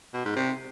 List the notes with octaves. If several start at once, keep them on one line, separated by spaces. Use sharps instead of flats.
B2
G#2
C3